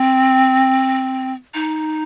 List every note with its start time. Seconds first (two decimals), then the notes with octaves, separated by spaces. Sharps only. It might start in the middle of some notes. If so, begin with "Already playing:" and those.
Already playing: C4
1.54 D#4